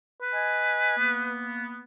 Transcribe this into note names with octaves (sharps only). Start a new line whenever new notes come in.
B4
D#5 G#5
A#3 B3